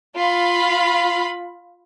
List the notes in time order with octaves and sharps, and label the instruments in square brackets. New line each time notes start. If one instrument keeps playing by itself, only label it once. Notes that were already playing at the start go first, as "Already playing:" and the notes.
[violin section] F4 B5